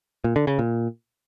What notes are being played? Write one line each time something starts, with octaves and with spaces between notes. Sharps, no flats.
A#2
D3
C#3
A#2